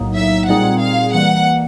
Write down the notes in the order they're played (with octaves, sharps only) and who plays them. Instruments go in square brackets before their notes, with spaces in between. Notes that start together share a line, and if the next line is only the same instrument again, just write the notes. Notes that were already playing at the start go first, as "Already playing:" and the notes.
Already playing: [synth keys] B1 A2 F#3 A#3 D#4
[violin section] E5
[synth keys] A#2 G3 C4 D#4 G#4 [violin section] F#5
[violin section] F5
[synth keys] E3 G3 A#3 [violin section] F#5